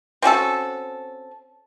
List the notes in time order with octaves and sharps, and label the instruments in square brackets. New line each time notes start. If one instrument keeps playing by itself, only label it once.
[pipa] C4 C#4 F#4 A4